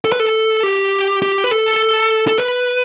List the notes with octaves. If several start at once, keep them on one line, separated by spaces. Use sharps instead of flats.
A4
B4
A4
G4
G4
B4
A4
A4
B4